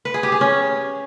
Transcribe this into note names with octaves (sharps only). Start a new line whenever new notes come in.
B4
G#4
G4
G#4
C#4